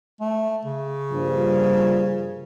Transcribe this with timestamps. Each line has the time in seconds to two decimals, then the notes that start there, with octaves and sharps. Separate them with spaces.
0.21 A3
0.65 C#3
1.11 G2 A#2 F3